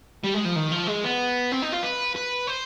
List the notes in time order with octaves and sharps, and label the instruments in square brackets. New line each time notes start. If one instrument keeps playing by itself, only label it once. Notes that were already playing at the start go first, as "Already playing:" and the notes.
[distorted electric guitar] G3
G#3
F3
D#3
F3
G#3
B3
C4
D#4
F4
B4
B4
C5